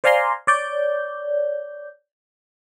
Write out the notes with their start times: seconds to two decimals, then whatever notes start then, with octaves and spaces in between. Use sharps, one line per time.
0.04 C5 D5 F5 G#5 A#5 C6
0.47 C#5 D5 G6